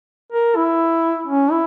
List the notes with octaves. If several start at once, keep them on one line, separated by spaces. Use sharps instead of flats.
A#4
E4
C#4
E4